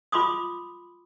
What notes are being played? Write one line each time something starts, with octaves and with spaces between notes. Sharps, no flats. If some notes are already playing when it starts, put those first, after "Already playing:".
F4 B5 C6 D6 D#6